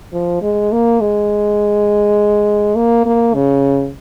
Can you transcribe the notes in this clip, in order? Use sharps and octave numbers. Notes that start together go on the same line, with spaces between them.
F3
G#3
A#3
G#3
A#3
A#3
C#3